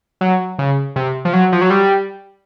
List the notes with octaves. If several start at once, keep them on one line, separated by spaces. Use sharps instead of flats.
F#3
C#3
C3
F3
F#3
F3
F#3
G3